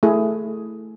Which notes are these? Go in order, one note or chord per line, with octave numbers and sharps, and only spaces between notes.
A3 E4 G#4